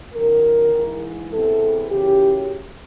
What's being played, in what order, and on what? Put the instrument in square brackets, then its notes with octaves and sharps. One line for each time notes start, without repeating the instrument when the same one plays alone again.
[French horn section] F#2 D#3 A#4
G#2 E3
E2 C3 E3 A4
F#2 C#3 E3 G4